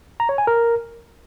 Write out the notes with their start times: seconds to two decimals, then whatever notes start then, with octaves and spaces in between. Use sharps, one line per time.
0.20 A#5
0.29 C#5
0.38 G#5
0.47 A#4